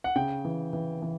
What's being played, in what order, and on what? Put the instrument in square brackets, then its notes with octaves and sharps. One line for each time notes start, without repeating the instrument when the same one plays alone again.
[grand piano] F#5
C#3 G5
E3
E3
E3